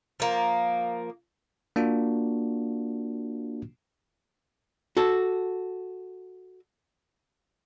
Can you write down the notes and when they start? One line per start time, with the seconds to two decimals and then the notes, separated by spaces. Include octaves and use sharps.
0.20 F3 A#3
1.76 A#3 D4 F4 F#4
4.97 F#4 A4